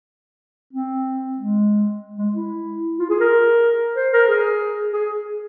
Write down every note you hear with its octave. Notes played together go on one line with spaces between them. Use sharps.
C4
G#3
G#3
E4
F4
G#4
A#4
C5
A#4
G#4
G#4